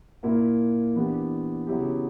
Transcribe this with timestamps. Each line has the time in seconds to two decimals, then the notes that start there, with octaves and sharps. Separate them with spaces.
0.23 A#2 A#3 E4
0.95 E3 B3 D4 G4
1.66 C#3 F#3 B3 E4 G4